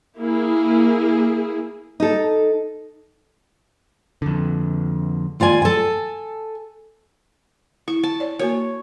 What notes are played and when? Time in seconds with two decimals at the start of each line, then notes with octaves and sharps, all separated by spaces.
0.18 A#3 E4 G#4
2.00 D#4 A4
4.22 F2 D3
5.40 D#2 F4 D5 G#5
5.62 A4 G#5
7.88 E4 C#6
8.04 A5
8.20 C#5 D5
8.39 A#3 F#4 A#4 C#5